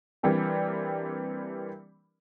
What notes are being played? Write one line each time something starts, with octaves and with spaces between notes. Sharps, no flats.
E3 G3 A#3 C4 D4